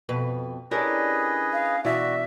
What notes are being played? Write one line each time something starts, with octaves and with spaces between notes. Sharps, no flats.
F2 B2 B4
C#4 D4 E4 G4 G#4 A#4 B4 D#5
F5
B2 E3 F#4 D5 E5